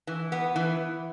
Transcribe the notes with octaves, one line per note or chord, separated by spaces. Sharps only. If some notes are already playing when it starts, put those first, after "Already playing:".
E3
B3
E3